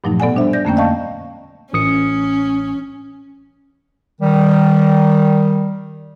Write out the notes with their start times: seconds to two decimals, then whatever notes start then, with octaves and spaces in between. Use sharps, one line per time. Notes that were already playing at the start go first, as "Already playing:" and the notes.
0.04 G2 A#2 F3 F#3 A3 D#4
0.20 B2 B3 A4 D5 F#5 G#5
0.36 G3 D4 C5 E5
0.53 D5 G6 A#6
0.65 F2 D3 A3 A#3 C#4 G5
0.76 D5 D#5 F5 A5 C#6 G6
1.73 A1 C#4 D#6 C#7
4.21 D#3 G3